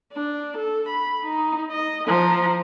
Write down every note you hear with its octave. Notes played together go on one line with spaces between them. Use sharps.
D4
A4
B5
D#4
D#5
F3 A#5